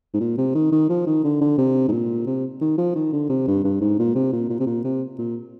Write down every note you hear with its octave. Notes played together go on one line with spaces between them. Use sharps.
G#2
A#2
C3
D#3
D#3
F3
D#3
D3
D3
C3
G#2
A#2
C3
D#3
F3
D#3
D3
C3
G2
G2
G#2
A#2
C3
A#2
A#2
C3
A#2
C3
A#2